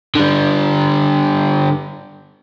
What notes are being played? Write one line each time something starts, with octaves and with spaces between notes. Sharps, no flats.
D3 G3